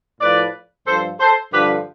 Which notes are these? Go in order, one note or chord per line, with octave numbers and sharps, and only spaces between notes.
A2 F3 B4 D5
G2 F3 A4 C5
A4 C5
G2 D3 F3 G4 B4